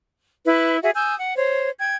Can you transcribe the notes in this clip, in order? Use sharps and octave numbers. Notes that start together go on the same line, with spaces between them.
E4 B4
F#4 G#4 E5
G#5 D#6 E6 G6
F#5
C5 C#5
G5 G#6